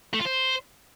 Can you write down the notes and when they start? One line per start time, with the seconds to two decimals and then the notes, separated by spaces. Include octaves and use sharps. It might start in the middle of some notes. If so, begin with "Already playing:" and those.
0.14 A3
0.20 F4
0.25 C5